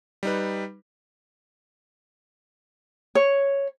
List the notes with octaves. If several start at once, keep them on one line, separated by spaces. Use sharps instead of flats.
G3 D#4 B4
C#5